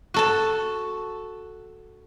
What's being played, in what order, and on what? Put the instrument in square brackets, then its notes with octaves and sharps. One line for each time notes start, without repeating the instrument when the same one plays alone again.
[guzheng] F#4 A4 A5